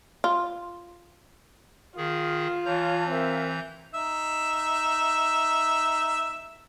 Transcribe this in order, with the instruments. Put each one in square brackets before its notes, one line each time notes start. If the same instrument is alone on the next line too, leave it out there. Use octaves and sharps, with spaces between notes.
[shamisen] F4
[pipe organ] D#3 G#4 [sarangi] F4
[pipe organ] E3 A#5 G6 [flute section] C#5 A5
[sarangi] C4 [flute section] A#4 E5 F5
[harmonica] D#4 E5